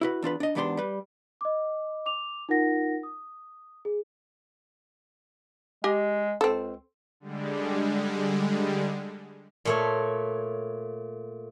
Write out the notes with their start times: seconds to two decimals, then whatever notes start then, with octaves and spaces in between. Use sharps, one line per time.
0.01 E4 F#4 B4
0.22 E2 D4 F4 B4
0.40 D4 D#5
0.55 E2 G#2 B3 D4 G4 C6
0.77 G3 B4
1.41 D#5 D6
2.06 D6 F7
2.49 D#4 F4 A#4 F#5 A#6
3.03 D#6
3.85 G#4
5.84 G#3 G4 D#5 G#5
6.41 C#2 C4 A4
7.20 D3 G3 G#3
9.65 A#2 A3 C#5